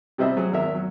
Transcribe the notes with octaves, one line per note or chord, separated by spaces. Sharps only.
C3 G3 B3 C5 D#5 E5
F#3 G#4
G#1 E2 A#4 E5
F#3